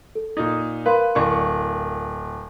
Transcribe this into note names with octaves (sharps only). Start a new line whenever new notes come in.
A4
A#2 D#4
A#4 B4 F5 C6
D1 C#6